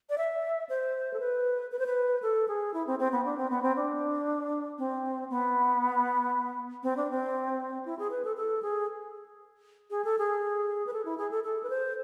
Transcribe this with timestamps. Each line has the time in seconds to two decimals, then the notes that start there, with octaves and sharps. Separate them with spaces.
0.09 D5
0.18 E5
0.69 C5
1.13 A4
1.20 B4
1.71 B4
1.79 C5
1.86 B4
2.22 A4
2.48 G#4
2.74 E4
2.87 C4
2.99 C4
3.12 B3
3.25 D4
3.37 C4
3.50 B3
3.62 C4
3.76 D4
4.78 C4
5.30 B3
6.83 C4
6.97 D4
7.10 C4
7.85 E4
7.99 G#4
8.11 B4
8.25 A4
8.37 A4
8.62 G#4
9.90 G#4
10.04 A4
10.18 G#4
10.87 B4
10.93 A4
11.05 E4
11.18 G#4
11.31 A4
11.44 A4
11.63 B4
11.70 C5